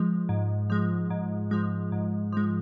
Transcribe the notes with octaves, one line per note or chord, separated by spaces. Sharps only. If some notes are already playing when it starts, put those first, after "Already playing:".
Already playing: F3 G#3
G#2
F3 G#3
G#2
F3 G#3
G#2
F3 G#3